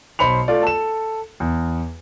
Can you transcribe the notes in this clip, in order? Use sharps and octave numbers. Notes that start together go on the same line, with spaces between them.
B1 C5 B5 C#7 F7
A3 F4 D5
A4 E7
E2